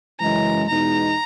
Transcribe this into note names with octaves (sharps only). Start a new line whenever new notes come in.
F#2 C#3 E3 G#3 A#5
E2 B2 G#3 D#4 A#5